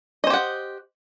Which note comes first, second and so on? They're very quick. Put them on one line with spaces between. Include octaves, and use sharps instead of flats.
D#5 C5 G4 F#5